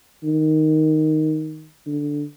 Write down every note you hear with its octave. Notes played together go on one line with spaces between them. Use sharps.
D#3
D3